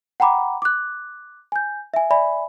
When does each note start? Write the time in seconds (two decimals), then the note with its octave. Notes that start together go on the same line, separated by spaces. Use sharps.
0.20 F#5 G5 A#5 B5 D6
0.62 D6 F#6
1.52 G#5 G6
1.94 E5 G#5
2.10 D5 E5 G#5 B5